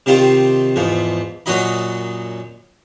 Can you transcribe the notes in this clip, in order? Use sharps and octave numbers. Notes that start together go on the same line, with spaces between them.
C3 D#3 G3 C4 F4
E2 G#2 F3
F#2 A#2 F#3 F#4 D#5 B5